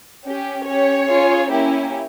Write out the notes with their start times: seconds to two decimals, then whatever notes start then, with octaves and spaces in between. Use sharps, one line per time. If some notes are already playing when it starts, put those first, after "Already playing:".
0.23 C#4 G4
0.65 C#4 G4 C#5
1.07 C#4 F4 G#4
1.50 A#3 C#4 E4 G4